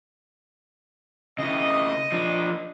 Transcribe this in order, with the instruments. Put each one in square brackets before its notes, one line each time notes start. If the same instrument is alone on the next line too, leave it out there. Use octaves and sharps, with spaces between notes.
[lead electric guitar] C#3 E4 [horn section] D#5
[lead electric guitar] F3 D4